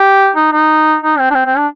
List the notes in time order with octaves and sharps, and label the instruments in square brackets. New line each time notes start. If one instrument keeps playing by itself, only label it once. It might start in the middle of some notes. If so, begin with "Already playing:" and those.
Already playing: [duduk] G4
D#4
D#4
D#4
C4
D4
C4
C4
D4